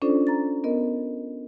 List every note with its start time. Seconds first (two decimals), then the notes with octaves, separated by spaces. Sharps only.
0.02 C#4 D4 F4 A4 C5 D5
0.27 A#5 A6
0.64 B3 A#4 D#5